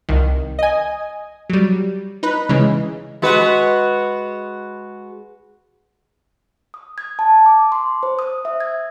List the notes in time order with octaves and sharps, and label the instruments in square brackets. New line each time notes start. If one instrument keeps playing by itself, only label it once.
[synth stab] C2 D#3
D#5 G#5
F#3 G3
D#4 B4
C#3 E3 G#3
[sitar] G#3 F#4 B4
[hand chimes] D#6
G#6
A5
D6
C6
C5
D#6
E5
G#6